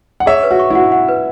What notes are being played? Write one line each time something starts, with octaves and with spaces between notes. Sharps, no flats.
F#5
G#4 C#5 E5
B4
F#4
C#6
E4
F#4 F#5
F#5
B4